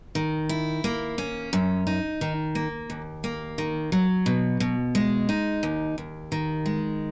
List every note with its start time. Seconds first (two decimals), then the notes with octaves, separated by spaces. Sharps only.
0.15 D#3
0.49 E4
0.84 A#3
1.18 C#4
1.53 F#2
1.87 D#4
2.21 D#3
2.55 A#3
2.90 D#2
3.24 A#3
3.58 D#3
3.92 F#3
4.26 B2
4.60 B2
4.95 G#3
5.29 D#4
5.63 D#2
5.98 D#2
6.32 D#3
6.66 G#3